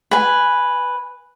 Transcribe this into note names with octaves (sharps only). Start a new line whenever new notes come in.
B4 G#5